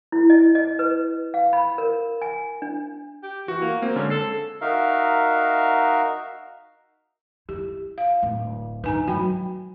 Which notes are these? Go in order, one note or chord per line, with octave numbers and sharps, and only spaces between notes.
E4
D#5
D#5
B4
F5
B5
A#4
G#5
D4
G4
E3 F#4
A#3
A#3 C4 C5
D3 G#3 C#4
A4 C7
D#4 F#4 A#4 E5 F5
E4 G4
F5
D1
D4 D#4 B4 G#5 A#5
F#3 F#4 G5 B5